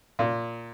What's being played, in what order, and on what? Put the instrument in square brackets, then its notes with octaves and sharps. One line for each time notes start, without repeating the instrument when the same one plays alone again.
[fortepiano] A#2